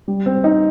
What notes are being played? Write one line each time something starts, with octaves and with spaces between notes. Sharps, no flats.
G3
C4
D#4